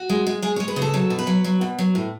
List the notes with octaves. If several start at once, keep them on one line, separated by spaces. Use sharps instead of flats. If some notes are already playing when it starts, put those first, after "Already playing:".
Already playing: F#4
G#3
G#3
G#3 G#4
G#3 C#5
B4
C#3
A4
F#3 A4
B2
B4
F#3
F#3
B2
F#3
A2